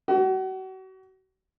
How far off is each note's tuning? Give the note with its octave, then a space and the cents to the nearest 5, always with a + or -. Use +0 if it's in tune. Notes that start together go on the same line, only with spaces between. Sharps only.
F#4 +35